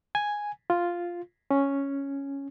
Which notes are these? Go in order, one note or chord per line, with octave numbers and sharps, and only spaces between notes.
G#5
F4
C#4